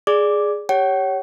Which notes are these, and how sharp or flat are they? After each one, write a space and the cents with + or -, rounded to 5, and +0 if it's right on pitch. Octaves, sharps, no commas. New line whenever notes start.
G#4 +0 D5 +0 D6 +0
G4 +5 C#5 +0 F#5 +45